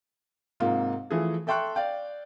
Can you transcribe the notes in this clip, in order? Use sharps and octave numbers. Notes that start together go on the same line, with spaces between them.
G#2 C3 A#3 F4
E3 F3 A3 G#4
A4 E5 G5 C6 C#6 F#6
D5 F5 G5